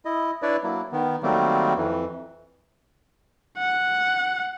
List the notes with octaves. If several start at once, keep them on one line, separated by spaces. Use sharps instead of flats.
E4 D#5
D4 E4 B4 C#5 D5
F#3 A#3 E4
D#3 B3
D#3 F#3 G3 A3 A#3 C4
F2 E3
F#5